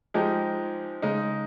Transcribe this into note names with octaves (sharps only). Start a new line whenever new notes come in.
F3 G#3 D#4 G4
C#3 G#3 D#4